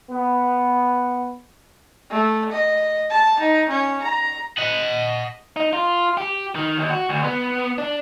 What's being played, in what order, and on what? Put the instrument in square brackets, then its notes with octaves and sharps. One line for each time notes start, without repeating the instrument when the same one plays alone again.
[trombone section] B3
[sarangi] A3
D#5
A5
D#4
C#4
A#5
[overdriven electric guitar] D#5 F#5
[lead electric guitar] D#4
F4
G4
D#3
D#2
F#4
D2
B3
D4